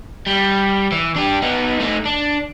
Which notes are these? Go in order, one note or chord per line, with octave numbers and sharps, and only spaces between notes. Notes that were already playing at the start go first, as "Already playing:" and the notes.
G3
E3
D4 G4
B3 D#4
A3 D#4
D4